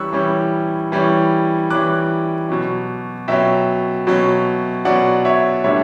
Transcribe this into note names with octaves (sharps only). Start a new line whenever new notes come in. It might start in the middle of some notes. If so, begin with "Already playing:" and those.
Already playing: E3 G3 C#4 C#6 E6 F#6
E3 G3 C#4
E3 G3 C#4
E3 G3 C#4 D6 F#6
B2 F#3 C#4
B2 F#3 C#4 E5 G5
B2 F#3 C#4
B2 F#3 C#4 D5 F#5
C#5 E5
A2 G3 D4 C#5 E5